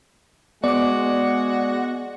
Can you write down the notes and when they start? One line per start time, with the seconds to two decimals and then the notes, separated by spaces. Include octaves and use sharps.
0.64 G#3 B3 F#4 D5 D6